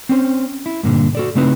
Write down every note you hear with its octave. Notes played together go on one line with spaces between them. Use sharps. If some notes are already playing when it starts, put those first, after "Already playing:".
C4 C#4 B4 C5
E4
G2 A#2 D3
F#4 A4 D5
C#3 A3 C4 D#4 E4 B4